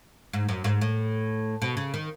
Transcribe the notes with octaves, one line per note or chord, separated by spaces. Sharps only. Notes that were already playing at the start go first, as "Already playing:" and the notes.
G#2
F#2
G#2
A2
B2
C#3
D#3